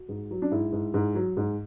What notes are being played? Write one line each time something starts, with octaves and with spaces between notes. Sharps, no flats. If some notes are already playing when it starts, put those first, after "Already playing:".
Already playing: F#4
G#2
F#3
D4
G#2 E4
G#2
G#2
F#3
G#2